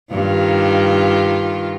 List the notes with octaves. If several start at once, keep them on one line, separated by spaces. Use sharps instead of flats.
G2 D#3 F4